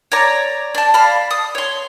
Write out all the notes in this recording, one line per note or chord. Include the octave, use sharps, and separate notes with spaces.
C#5 D5 A#5
D4 A5
D5 F5 B5
D#6
C#5 C6